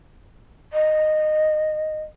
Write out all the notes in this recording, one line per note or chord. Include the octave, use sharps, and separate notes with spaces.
D#5